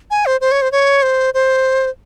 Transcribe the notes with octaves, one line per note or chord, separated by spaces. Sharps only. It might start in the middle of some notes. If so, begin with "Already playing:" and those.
G#5
C5
C5
C#5
C5
C#5
C5
C5